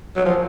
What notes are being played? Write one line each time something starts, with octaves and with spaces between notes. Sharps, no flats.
F#3
F3